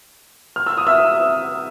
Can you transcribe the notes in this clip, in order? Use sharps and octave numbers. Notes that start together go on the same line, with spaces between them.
F6
E6
D#6
E5 E6